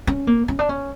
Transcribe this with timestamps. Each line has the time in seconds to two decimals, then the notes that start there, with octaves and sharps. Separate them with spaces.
0.07 C#4
0.27 A#3
0.48 C#4
0.59 D4
0.69 C#4